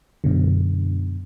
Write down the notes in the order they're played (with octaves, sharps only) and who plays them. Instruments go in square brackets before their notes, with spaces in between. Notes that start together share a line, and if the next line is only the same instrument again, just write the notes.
[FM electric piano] F#2 B2 D3